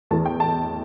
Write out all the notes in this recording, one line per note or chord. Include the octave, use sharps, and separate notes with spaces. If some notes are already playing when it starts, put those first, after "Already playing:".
E2 E3 A3 A5
G5
A5